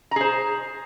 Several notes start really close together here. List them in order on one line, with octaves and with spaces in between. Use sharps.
A#5 G#4 C5